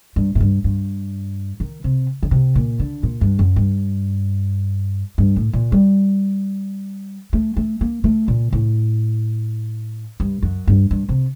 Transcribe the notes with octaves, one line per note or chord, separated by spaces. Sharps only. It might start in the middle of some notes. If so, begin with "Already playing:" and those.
G2
A2
G2
G2
D#3
C3
D3
C3
A#2
D3
A#2
G2
F#2
G2
G2
A2
A#2
G3
A3
A3
A#3
A3
A#2
A2
G2
F#2
G2
G2
C3